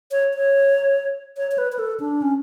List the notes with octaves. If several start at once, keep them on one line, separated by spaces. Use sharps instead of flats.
C#5
C#5
C#5
C#5
B4
B4
A4
D4
C#4